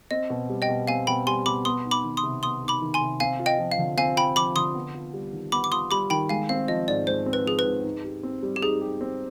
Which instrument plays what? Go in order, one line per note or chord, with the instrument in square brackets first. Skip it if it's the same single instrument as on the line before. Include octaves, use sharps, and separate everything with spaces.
[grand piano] C4 [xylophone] D#5
[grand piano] B2
G3
[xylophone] D#5 G5
[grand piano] B2
[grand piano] C4 [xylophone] F5 G#5
[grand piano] B2 [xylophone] G5 B5
[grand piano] G3 [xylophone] G#5 C6
[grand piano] B2 [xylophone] B5 D6
[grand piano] B3 [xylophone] C6 D#6
[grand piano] D#4
[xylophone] B5 D6
[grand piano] D#3
[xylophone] C6 D#6
[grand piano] C3
[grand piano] B3 [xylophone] C6 D#6
[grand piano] D#4
[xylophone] B5 D6
[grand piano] D#3
[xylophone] G#5 C6
[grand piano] C3
[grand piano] C4 [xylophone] F5 G#5
[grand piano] F4
[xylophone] D#5 G5
[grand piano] F3
[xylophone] F5
[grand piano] D3
[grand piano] C4 [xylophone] F5 G#5
[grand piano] F4 [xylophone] G5 B5
[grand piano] F3 [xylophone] B5 D6
[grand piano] D3 [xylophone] C6 D#6
[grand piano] B3
F4
G3
D#3
[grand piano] B3 [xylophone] B5 D6
[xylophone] D6
[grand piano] F4 [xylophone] C6 D#6
[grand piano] G3 [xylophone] B5 D6
[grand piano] D#3 [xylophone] G5 B5
[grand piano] G#3 [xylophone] F5 G#5
[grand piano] C4 [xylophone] F5
[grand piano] F3 [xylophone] D#5
[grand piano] G#2 [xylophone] D5
[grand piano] G#3 [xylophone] C5
[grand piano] C4
[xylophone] B4
[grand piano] F3 [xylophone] G#4
[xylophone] B4
[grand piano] G#2
D#4
G4
C4
G3
[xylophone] G4
[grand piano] D#4 [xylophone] G#4
[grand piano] G4
C4